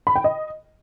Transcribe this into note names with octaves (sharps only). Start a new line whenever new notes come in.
B5
G5
D#5